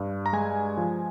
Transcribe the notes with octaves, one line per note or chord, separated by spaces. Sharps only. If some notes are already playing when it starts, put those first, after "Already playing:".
Already playing: G2
A#5
G#3 G#5
F3